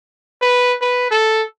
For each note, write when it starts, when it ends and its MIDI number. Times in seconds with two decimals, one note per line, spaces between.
0.42 0.75 71
0.81 1.08 71
1.11 1.43 69